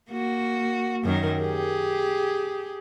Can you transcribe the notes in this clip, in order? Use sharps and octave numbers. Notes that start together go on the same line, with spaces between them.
A#3 F#4
F#2 D#3 A#4
G4 G#4